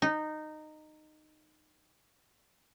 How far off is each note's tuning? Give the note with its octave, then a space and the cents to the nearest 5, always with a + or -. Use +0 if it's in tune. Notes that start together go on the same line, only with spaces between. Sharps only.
D#4 -15